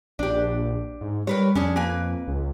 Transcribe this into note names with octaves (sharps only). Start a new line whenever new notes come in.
A#1 D4 G4
G#2
G3 A#4 B4 C#5
F2 C#4 D4 G#4
A#3 B4 G#5
C#2